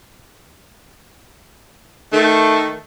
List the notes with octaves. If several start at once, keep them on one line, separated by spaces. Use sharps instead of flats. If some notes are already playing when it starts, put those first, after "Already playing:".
D#3 A3